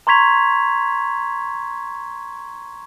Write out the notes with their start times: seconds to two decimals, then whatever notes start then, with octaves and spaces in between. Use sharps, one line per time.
0.07 A#5 C6 C#6 G#6 B6 F7